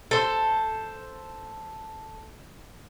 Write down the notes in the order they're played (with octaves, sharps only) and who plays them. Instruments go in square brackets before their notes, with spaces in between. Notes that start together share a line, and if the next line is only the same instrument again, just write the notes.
[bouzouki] A4 C5